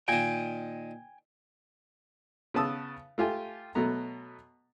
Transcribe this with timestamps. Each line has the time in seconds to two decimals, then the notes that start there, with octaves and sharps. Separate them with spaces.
0.08 A#2 D#3 G5 G#5
2.54 C#3 B3 B4 A5 D#6 E6
3.18 A3 F4 G4 G#5
3.75 B2 F#3 A3 B3 A#5